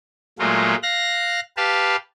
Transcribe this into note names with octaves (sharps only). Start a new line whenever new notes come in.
A#2 F#3 G#3 A3 F4
F5 F#6 A#6
G4 B4 F5 A5